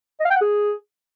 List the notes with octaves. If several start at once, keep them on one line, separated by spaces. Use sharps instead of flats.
D#5
F5
G5
F#5
G#4